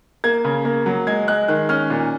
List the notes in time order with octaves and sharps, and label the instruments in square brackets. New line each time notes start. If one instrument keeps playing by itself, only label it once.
[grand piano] A#3 G#6
C#3
A#3
F#3
G#3 G#6
G#3 F#6
D#3 F#6
C#4 F6
A#2